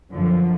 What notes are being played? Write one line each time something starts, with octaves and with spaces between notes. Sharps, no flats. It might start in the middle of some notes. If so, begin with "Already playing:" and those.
F#2 D3 F3